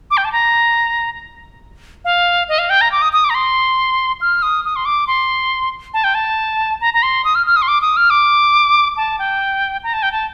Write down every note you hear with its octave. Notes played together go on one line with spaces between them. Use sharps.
D6
G5
A5
A#5
F5
D#5
F5
G5
A#5
D6
D#6
D#6
D6
A#5
C6
F6
D#6
D#6
C6
D6
C6
A5
G5
A5
A#5
A#5
C6
D#6
F6
F6
D#6
C6
D6
D#6
F6
D6
A5
G5
A#5
A5
G5
A5